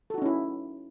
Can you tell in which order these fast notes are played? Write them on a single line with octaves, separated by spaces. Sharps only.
A4 F#4 D#4 C#4 E4